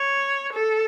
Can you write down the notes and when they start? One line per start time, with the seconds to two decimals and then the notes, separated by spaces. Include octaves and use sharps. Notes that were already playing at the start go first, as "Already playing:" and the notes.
Already playing: C#5
0.53 A4